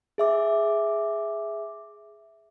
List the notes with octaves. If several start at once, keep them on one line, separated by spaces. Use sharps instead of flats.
G#4 E5 D6